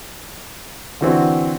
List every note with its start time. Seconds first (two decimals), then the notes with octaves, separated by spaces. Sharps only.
1.01 D3 E3 C4 F#4